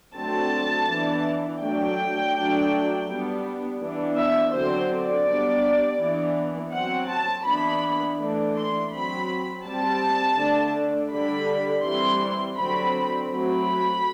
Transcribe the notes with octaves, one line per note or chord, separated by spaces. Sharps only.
D3 F#3 A3 C4 A5
E3 B3 D4
F#3 A3 D4 G5
F#3 A3 D4
G3 B3 D4
E3 B3 D4
E5
D3 F#3 C4 C5
D5
G3 B3 D4
E3 B3 D4
F#3 C4 F#5
A5
E3 B3 D4 B5
E3 A3 D4
C6
F#3 C4 B5
G3 C4 A5
D3 A3 D4
D3 G3 D4 B5
E3 G3 C4 C6
D3 F#3 C4 B5
F#3 A3 C4 B5